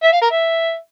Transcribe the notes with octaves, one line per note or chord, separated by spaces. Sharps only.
E5
F5
A#4
E5